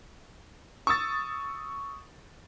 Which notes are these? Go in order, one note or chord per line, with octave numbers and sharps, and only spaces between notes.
C#6 D#6 E6 A6